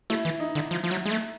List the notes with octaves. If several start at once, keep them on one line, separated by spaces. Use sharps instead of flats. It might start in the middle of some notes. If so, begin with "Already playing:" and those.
A3 E4
E3
D#4
D3
F3
F3
F#3
G#3
A3